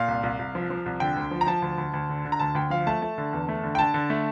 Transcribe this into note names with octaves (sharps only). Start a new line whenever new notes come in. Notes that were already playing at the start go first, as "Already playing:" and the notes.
Already playing: A#2 F5
C2
C2
C2
F3
F3
C2
D3 G5
D2
F3
A#5
F3 A5
D2
D2
D2
D3
D3
A#5
D2 A5
D2 G5
F3 F5
A3 A5
A3
D3
E2
A3
D3
G5
D3 A5
D3
A3